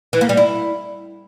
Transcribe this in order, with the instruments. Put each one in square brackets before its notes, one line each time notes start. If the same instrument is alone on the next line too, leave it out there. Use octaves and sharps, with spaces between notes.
[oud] E3
A#3
G3
E4